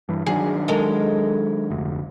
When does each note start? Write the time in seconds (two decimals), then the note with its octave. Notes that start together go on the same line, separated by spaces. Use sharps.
0.09 G2 E3
0.26 D#3 F#3 D4 G#4
0.68 G#3 A4 A#4
1.70 F1 D2